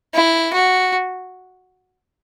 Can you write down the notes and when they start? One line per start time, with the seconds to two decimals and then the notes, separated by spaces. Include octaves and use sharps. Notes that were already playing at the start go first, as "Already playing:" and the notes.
0.14 E4
0.53 F#4